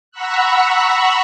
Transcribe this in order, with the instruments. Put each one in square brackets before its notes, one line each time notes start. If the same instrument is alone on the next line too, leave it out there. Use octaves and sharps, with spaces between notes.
[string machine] F#5 A#5 B5 C#6 E6 F#6